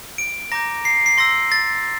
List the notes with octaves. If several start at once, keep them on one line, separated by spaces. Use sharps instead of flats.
D7
A#5 D6 G6 A#6
C7
C7
C6 E6 G6 A#6
A6